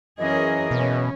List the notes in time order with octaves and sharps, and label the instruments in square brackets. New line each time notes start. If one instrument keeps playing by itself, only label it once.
[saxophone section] F#2 E3 [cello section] C#4 G#4 A#4 [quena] D#5
[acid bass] B2 [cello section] C#4